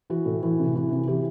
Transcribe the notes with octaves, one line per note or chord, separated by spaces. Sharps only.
E3 F#4
A2
E3
C3
E3
C3
E3 G4